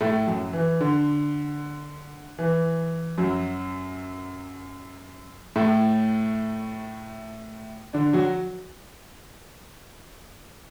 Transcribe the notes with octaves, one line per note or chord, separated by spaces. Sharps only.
A2 A3
F#2 F#3
E3
D3
E3
F#2 F#3
A2 A3
D3 D4
F#3 F#4